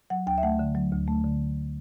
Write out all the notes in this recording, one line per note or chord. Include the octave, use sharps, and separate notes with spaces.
F#3 F#5
D2 G5
E5
A3 F#5
D3
F#3
D2
A3
D3